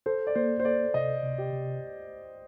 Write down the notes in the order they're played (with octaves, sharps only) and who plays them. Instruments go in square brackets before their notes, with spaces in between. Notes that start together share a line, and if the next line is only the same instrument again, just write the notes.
[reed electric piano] A4 [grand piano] C5
[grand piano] D5
[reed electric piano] A#3 [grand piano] C5
[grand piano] C5
[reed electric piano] A4 [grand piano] D5
[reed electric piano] C3 [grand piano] D#5
[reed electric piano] C3
[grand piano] G4
[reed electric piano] C3